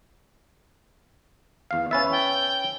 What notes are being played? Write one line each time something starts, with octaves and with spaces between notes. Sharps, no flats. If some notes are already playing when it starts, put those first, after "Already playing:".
E2 F5
C#4 B4 E5 A6
G5